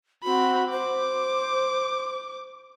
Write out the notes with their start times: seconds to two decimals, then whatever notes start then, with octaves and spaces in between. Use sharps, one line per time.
0.23 C4 F#4 B5
0.71 C5 D6